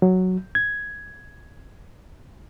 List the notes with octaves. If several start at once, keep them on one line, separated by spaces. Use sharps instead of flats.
F#3
G#6